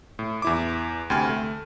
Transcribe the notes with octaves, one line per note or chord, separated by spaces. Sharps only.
A2
E2 E4 D6
D2 C3 G5 G#5 C6 F6
A3